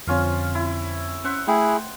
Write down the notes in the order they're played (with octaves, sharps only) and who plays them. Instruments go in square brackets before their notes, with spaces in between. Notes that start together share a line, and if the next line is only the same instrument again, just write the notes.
[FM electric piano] F2 D3 C4 [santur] C#4 F4 F5
[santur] E4
[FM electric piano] C#4 [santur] C5 E5 F#5
[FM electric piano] A3 G5 [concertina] E4 G#4